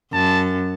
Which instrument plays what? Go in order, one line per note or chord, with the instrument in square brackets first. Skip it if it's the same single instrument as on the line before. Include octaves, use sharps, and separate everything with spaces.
[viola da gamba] F#2 [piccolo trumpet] A5